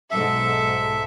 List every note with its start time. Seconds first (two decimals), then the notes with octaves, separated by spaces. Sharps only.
0.11 B1 G#2 A4 E5